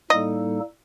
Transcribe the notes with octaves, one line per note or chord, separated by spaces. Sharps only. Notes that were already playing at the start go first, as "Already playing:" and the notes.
A2 G3 A#3 D#4 A4 D#5